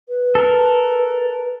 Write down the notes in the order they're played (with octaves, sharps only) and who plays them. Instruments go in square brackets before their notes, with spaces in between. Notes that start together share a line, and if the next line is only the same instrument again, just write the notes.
[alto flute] B4
[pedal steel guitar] A4 A#4